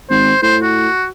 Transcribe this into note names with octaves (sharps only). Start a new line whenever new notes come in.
G#1 C5
A2 C5
F#4